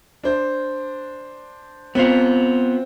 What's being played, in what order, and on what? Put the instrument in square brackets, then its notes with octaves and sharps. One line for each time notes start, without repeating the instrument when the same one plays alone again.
[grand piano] D4 C5
[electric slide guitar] B3 F4 [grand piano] C4